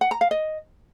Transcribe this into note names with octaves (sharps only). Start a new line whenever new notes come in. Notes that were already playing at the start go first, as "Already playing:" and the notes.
F#5
A#5
F5
D#5